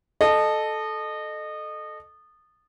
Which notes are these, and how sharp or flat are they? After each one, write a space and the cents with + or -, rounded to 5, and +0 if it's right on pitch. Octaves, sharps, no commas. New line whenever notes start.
A4 -10 D#5 -25